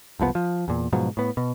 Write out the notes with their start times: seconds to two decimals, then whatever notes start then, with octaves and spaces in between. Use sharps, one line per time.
0.20 F#1 C2 F3 B3
0.35 F3
0.68 E2 A#2
0.93 G#2 B2 F3 F#3
1.17 A2 B3
1.37 B2